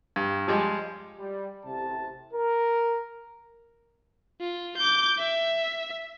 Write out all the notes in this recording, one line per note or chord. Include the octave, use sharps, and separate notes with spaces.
G2
F3 G3 G#3 G#4
G3
A1 C3 A5
A#4
F4
D6 G6
E5